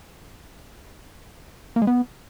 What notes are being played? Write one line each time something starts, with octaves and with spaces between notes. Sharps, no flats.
A#3
G#3
B3